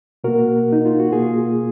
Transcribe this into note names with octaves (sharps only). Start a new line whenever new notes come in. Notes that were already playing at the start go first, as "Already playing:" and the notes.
B2 A#3 F#4 A#4
D#4
F4
F#4
B2 A#3 F4 G#4